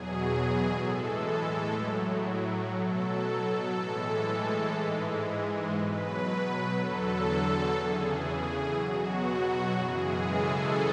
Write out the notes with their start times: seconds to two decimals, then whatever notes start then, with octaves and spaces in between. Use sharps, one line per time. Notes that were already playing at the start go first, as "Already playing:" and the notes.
Already playing: E2 B2 F#3 G#4
0.71 A2 E3 G#3 A4
1.71 A2 F#3
2.71 B2 F#3 A4
3.71 A2 E3 G#3 A4
4.71 G#2 E3 G#3
5.71 B2 F#3 B4
6.71 E2 D3 F#3 A4
7.72 E2 C#3 E3 G#4
8.22 G#4
8.71 B2 F#3 F#4
9.22 F#4
9.72 F#2 C#3 E3 G#3 G#4
10.22 A4